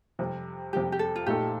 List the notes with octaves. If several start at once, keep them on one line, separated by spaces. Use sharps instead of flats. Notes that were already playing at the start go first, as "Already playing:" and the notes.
F2 C3 G3
F2 C3 G3 G4
G4
A4
F4
A#2 A3 D#4 G4 A4